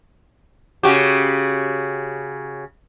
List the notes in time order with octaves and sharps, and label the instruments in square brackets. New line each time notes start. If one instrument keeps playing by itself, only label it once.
[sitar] C#3 F#4 G4